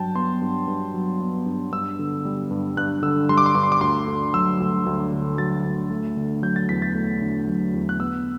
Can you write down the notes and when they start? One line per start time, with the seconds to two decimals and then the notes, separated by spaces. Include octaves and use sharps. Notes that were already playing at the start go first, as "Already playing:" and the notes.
Already playing: G2 F#3 G5 A5
0.15 B3 C6
0.41 G2
0.68 G2
0.94 F#3
1.21 B3
1.46 G2
1.72 G2 E6
1.99 D3
2.25 G3
2.51 G2
2.77 G2 F#6
3.02 D3 E6
3.29 G3 C6
3.38 D6
3.46 C6
3.55 G2 D6
3.63 C6
3.72 D6
3.81 D2 C6
4.08 D3
4.34 F#3 E6
4.60 D2
4.86 D2
5.13 D3
5.38 F#3 A6
5.64 D2
5.90 A3
6.17 D3
6.42 F#3 G6
6.56 A6
6.69 E2 B6
6.82 A6
6.95 A3
7.21 D3
7.47 F#3
7.74 E2
7.89 F#6
8.00 B3 E6